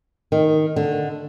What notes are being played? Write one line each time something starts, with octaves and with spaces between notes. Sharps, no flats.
D#3
D3